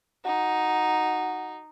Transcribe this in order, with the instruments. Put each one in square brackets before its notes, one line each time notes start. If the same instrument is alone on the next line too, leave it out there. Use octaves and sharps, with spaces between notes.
[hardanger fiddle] D#4 [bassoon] F#4